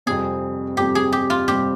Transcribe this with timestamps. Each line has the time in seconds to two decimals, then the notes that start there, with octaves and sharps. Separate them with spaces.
0.06 F2 C3 G3 C4 G#4
0.77 F2 C3 G3 C4 G4
0.95 G#4
1.12 G4
1.30 F4
1.48 C3 G3 C4 G4